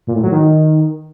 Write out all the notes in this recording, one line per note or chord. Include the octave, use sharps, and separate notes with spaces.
A#2
A2
F#3
D#3